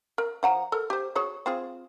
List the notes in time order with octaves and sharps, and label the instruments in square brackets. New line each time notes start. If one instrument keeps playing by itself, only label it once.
[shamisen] A#4
F3 F#5 A#5
A4 A#4
G4 C5
F#4 G#4 C#5
C4 F4 G#4